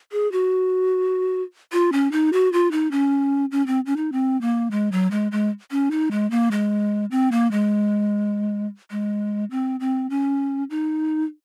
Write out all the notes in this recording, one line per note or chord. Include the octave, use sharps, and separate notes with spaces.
G#4
F#4
F4
C#4
D#4
F#4
F4
D#4
C#4
C#4
C4
C#4
D#4
C4
A#3
G#3
F#3
G#3
G#3
C#4
D#4
G#3
A#3
G#3
C4
A#3
G#3
G#3
C4
C4
C#4
D#4